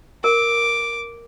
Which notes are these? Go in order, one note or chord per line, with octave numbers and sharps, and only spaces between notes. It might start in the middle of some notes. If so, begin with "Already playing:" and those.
A#4 D6